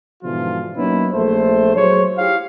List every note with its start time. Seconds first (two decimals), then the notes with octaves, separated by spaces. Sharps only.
0.23 G#2 B2 D3 E3 F3 F4
0.76 F#3 A#3 B3 C#4 D#4 E4
1.13 A#1 A3 C5
1.75 F#3 G#4 C5 C#5
2.17 E4 G4 F5